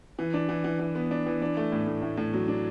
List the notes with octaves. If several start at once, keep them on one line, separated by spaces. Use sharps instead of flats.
E3
D4
E3
E3
E3
B3
D4
E3
D4
A3
A2
A2
A2
A2
F#3
D4